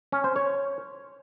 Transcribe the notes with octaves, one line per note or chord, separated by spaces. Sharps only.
C#4
C5
C#5